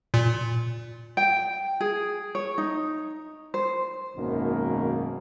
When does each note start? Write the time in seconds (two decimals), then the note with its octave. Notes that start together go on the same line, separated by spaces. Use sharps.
0.14 A#2
1.17 G5
1.80 G#4
2.35 C#5
2.58 D#4
3.54 C5
4.17 G#1 F#2 B2 D#3 A#3